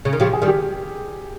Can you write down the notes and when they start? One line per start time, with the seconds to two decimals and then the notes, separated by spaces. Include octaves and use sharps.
0.05 C#3
0.13 D#3
0.20 C#3 F3 G4
0.33 G#4
0.42 D#3 G3
0.48 G4